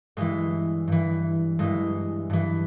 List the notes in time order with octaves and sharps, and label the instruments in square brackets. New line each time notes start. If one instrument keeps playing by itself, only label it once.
[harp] G2 E3 G#3
G2 E3
G2 E3 G#3
G2 E3